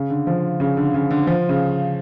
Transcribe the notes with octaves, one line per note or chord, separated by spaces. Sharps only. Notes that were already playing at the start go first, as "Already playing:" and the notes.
Already playing: C#3
D3
F3
C#3
D3
C#3
D3
F3
C#3